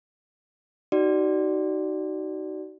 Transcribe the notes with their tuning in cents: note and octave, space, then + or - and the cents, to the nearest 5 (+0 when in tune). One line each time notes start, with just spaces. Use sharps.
D#4 +0 F#4 +35 D5 +0